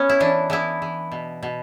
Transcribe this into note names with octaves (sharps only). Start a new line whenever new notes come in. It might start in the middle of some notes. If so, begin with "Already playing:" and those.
Already playing: B3 C#4
E4
E3 D4
E3 B3 E4
E3
B2
B2